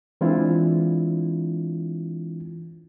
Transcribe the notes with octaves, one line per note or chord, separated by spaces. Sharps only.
E3 G#3 C4 D4 E4 F4